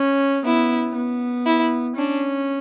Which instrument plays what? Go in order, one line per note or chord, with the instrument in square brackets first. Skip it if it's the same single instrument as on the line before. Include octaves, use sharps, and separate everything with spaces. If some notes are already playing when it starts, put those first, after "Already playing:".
Already playing: [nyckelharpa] C#4
[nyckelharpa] B3 [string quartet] E4
[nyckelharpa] B3
[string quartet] E4
[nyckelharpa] C#4 [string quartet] D4